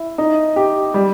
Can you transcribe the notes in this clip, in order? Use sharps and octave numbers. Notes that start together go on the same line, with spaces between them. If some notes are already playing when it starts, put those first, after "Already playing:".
Already playing: E4
D#4
G4
G3